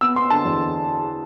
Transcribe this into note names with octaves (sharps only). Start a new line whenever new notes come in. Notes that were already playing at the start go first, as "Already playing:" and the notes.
B3 E6
B3 C6
D3 A5
E2